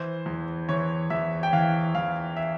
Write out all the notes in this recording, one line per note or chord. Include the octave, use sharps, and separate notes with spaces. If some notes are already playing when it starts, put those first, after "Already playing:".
Already playing: E3 C5
E2
E3 C#5
E2 E5
G5
E3 F5
E2 F5
E5